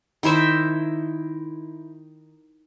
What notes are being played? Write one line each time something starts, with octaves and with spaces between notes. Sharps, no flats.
D#3 E4 C5 E5